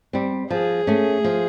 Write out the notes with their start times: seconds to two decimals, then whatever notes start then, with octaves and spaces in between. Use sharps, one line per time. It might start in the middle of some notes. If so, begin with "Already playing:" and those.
0.13 G3 C4
0.51 F3 G#4
0.87 A3 C#4
1.24 F3